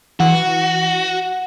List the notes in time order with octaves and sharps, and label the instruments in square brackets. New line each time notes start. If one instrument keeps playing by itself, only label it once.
[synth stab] E3 [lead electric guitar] F#4 [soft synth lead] F#5